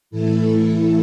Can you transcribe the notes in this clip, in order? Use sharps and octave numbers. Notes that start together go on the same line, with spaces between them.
A2 E3 A3 E4 A4